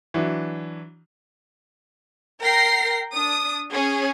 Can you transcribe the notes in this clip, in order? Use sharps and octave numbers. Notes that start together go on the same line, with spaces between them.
E3 F#3 D4
A#4 G5 A#6 C7
D4 D#6
C#4 G#4